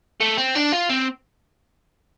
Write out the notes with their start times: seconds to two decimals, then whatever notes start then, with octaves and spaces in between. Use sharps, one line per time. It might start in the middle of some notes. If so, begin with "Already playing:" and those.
0.21 A3
0.38 C4
0.55 D4
0.72 F4
0.89 C4